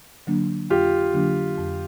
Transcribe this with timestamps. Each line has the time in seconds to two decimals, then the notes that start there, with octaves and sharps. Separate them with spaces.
0.27 D3 F#3 A#3 D4
0.70 F2 F4 G4
1.14 D3 F#3 A#3 D4
1.58 F2